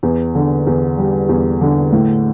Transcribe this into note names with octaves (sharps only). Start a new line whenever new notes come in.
E2
D3
E2
G3
E2
D3
A2